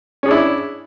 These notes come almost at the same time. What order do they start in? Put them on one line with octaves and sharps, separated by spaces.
C#4 G#4 D4 E4